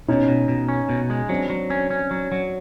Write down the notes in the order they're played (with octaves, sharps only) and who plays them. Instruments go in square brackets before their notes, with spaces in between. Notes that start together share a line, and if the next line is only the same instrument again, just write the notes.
[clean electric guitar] B2 [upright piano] C#4 D#4
[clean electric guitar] B2
B2
C#4
B2
G#3
[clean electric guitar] F#3 [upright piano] C4 D4
[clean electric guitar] F#3
C#4
C#4
F#3
F#3